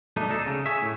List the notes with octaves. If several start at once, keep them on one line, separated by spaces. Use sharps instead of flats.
B1 A3 D4 D#4
D2 D4 D#4 A4
C#3
G#4 C#5 E5
A2